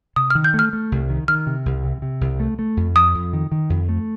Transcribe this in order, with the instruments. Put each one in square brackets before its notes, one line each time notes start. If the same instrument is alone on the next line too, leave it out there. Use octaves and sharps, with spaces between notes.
[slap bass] C3 [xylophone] D#6
[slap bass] D#3 [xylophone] F6
[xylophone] G6
[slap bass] A3
[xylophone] F6
[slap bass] A3
C2
D#3
[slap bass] D#3 [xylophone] F6
[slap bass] C3
C2
C3
C3
C2
A3
A3
F2
[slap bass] F2 [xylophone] D#6
[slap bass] F2
D#3
D#3
F2
A3